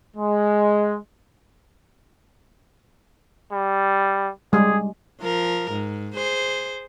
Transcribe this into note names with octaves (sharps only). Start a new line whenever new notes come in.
G#3
G3
G3 G#3 G#4
F3 A#4
G#2
G#4 C5